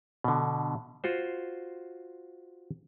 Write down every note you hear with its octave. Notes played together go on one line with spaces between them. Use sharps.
B2 D3
F4 F#4 C5